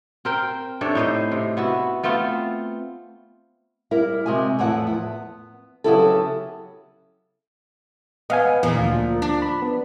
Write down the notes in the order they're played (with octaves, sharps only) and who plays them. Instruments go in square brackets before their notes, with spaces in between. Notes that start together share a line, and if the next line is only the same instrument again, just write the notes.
[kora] C4 A#4 G5
C3 D4 A4 C#5
A2 D#4 C5 D#5
C3
B3 E4 F#4
A3 B3 C4 F4
[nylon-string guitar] G3 E4 A#4
C3 G#3 F#4 G#5
E2 A2 F3 E4 F#5
B3
C#3 F#3 B3 E4 G4 A4
[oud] B3 [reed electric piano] D#5 F5 G#5
[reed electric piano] E2 [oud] A#2 F3 A#3
[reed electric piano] D2 F4
[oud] D4
[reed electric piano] B5
B3